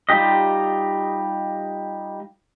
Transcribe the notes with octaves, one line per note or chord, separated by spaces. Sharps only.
G3 D#4 F4 G4 D#5